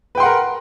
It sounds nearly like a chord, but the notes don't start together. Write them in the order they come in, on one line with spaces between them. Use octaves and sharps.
B4 G5 C6 F#5 A#4